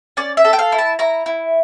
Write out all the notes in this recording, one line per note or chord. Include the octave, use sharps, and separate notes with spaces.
C#4 D5
E5
A4
G5
F5
E4
A5
E4 A#5
E4